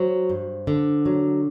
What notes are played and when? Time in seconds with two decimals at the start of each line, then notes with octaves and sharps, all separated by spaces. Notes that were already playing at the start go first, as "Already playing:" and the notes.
Already playing: F#3 C5
0.29 G2
0.67 D3
1.06 F#3